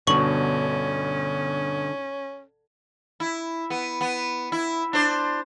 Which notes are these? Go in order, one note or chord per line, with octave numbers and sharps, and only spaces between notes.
G1 B2 D3 C#4 C#6 F#7
E4
B3
B3
E4
D4 C5